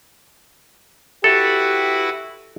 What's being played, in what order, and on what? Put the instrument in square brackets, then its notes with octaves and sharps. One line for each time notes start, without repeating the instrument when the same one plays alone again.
[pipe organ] E4 F#4 B4 [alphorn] G4 [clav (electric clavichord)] A4